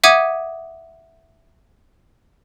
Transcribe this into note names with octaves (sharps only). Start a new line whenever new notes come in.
E5 F#5 D6 D#6 G#6 D#7